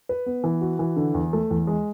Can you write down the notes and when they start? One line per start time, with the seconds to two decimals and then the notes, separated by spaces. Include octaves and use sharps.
0.09 B4
0.26 B3
0.44 E3
0.61 F#4
0.79 E3
0.97 D3
1.14 E2
1.33 A3
1.50 E2
1.67 G#3